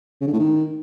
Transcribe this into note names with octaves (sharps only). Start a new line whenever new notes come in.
C#3
D3
A2
D#3